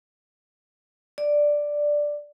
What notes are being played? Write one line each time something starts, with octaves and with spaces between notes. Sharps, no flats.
D5